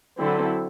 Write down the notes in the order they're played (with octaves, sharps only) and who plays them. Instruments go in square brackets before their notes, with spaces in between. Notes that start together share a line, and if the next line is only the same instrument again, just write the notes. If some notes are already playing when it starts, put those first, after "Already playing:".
[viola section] D3 F#3 C4 E4 A4